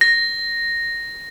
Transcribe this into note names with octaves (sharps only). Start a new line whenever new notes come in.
A#6